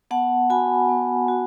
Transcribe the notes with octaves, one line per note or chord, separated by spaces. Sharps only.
B3 F#5 A5
F#4 G#5 B5
B3
F#4